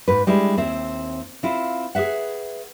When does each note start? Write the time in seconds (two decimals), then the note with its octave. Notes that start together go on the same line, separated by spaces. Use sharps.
0.08 G#2 B4
0.27 G3 G#3 D4 E4
0.57 D#2 C4 E4 E5
1.43 C4 E4 F4
1.95 G#4 A4 B4 E5 F#5